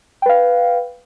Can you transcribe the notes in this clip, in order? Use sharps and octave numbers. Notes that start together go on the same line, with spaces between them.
B4 F5 G5